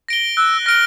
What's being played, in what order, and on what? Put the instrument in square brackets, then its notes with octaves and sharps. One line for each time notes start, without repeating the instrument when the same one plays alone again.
[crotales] A#6 D7 G7
[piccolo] E6 [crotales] F#6
[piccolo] F6 [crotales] A#6 D7 G7